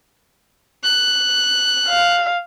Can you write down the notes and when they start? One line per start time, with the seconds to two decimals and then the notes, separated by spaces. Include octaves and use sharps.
0.84 F#6
1.89 F5